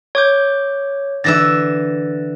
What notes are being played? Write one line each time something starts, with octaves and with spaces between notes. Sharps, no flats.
C#5 D6 G6
D3 E3 E5 A6 A#6